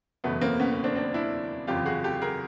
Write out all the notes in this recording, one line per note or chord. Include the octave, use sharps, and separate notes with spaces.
F#1 E2 B2 A3 B3
A#3 C4
B3 C#4
B3 C#4
C4 D4
C4 D4
D4 E4
F#1 E2 C3 F3 F4 G4
F#4 G#4
G4 A4
G#4 A#4